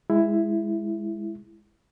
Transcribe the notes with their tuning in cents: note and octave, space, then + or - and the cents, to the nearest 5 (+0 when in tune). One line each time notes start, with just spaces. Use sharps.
G#3 -5 E4 +10